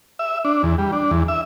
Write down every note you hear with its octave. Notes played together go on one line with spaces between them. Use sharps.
E5
D4
E2
G3
D4
E2
E5